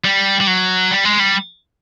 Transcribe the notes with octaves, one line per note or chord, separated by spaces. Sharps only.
G3
G3
F#3
G3
G#3
G3